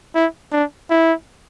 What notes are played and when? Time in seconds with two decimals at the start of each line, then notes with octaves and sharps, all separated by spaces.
0.15 E4
0.52 D4
0.90 E4